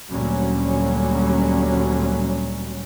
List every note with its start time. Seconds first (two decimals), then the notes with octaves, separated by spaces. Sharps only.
0.11 D2 A#2 F#3 G3 C#4